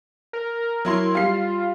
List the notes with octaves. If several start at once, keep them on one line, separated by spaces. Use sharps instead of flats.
A#4
F#3 E4 C6
G3 F4 C7